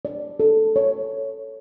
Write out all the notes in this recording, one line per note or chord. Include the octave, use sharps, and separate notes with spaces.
D5
A4
C#5